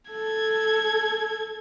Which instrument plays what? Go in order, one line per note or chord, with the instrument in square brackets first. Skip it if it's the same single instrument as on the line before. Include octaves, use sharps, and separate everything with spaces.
[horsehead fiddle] A4 [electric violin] G#6